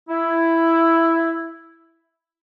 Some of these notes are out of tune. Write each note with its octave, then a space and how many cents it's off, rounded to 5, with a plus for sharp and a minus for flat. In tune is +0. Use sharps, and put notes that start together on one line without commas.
E4 +5